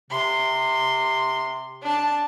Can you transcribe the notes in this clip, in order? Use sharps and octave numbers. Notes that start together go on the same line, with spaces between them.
C3 C6
D4 A5